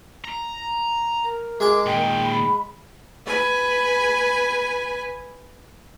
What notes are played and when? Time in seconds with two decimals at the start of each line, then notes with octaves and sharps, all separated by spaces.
0.25 A#5
1.24 A#4
1.60 G#3 G#4 D6
1.86 A#2 D#3 G5
2.24 B5
3.26 B4 G#5